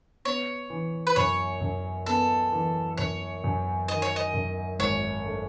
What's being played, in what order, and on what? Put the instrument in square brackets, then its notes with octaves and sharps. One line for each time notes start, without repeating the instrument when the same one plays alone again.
[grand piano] B3 [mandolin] C#5
[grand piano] E3
[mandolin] B4
[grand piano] F#2 [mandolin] C#5
[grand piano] F#2
[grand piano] B3 [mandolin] A4
[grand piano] E3
[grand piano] F#2 [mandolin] C#5
[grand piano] F#2
[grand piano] D#3 [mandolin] D#5
[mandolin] C#5
D#5
[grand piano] F#2
[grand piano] G#1 [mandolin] C#5
[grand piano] A3